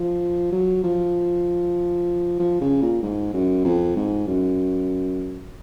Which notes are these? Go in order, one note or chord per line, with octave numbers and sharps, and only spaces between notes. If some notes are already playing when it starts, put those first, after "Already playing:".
Already playing: F3
F#3
F3
F3
C#3
A#2
G#2
F#2
F2
G#2
F#2